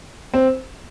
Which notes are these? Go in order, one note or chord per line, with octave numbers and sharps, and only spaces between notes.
C4